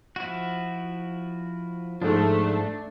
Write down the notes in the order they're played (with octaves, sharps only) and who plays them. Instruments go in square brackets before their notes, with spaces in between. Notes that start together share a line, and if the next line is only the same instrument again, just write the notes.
[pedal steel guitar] F3 E4 F#4
[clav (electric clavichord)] G#2 F3 [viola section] A3 [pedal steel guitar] D4